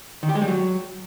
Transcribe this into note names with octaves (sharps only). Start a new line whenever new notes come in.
D#3
G4
G#3
G3
F#3